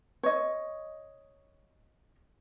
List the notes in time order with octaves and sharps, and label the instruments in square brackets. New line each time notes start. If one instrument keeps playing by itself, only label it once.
[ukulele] C#5 D#5